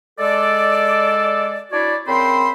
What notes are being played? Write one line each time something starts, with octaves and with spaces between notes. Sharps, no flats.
G#3 A4 D5
D4 E4 F#4 C#5 D5
C#3 C4 A#4 C5 B5 C6